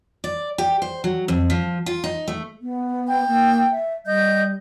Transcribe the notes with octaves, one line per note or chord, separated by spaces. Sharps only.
D5
G4
C5
F#3
F2
F3
F4
D#4
A3
B3
G5
A#3
E5
G3 D#5 G6